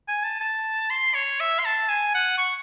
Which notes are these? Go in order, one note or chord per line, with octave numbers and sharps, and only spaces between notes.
G#5
A5
A5
C6
C#5
E5
C6
A5
G#5
F#5
C#6